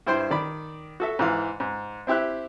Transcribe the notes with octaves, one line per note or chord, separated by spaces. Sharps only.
G2 E4 C5 G5 C6
D#3 D5 B5
F#4 A4 E5
G#2 E3 F5
G#2
C4 E4 G4 E5 F#6